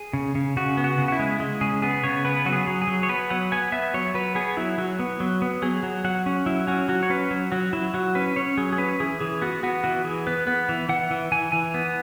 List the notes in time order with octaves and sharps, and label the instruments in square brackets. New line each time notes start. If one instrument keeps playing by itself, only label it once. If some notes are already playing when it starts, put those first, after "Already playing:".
Already playing: [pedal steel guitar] G#4
C#3
C#3
C#3 F#4
B3
F#4
C#3
F#4
E4
G#3
G#3
C#3 G#4
B3 G#4
C#3 C#5
B3 B4
F#3 F#4
G#4
F#3
G#4
F#3
C#5
B3 B4
F#3 F#5
B3 G#5
B3 E5
F#3 C#5
F#3 B4
B3 G#4
F#3 E4
F#3 F#4
B3
F#3
B3
F#3 G#4
F#3
F#3 F#5
C#4
F#3 E4
C#4 F#4
F#3 F#4
C#5
C#4 B4
F#3
F#3 F#4
F#3 E4
F#3 F#4
C#4 B4
C#4 C#5
F#3 G#4
G#4
C#4 B4
E3 G#4
E3 G#4
B3 F#4
B3 F#4
E3 F#4
E3 G#4
B3 B4
B3 B4
E3
E3 F#5
E3
E3 G#5
E3 G#5
B3